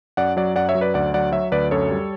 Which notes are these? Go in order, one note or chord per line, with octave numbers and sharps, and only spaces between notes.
F#2 D5 F#5
F#3 D5 F#5
F#2 D5 F#5
C#5 E5
F#3
B4 D5
D2 D5 F#5
F#3 D5 F#5
F#3 C#5 E5
D2 B4 D5
F#2 A4 C#5
G3